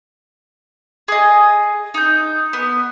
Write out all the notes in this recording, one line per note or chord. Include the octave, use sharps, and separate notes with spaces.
G#4 D#5
D#4 G6
B3